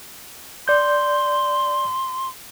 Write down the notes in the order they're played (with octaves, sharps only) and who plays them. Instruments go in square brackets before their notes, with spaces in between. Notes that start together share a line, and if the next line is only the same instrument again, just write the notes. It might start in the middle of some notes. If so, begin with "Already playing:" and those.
[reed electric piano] D5 G6 [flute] C6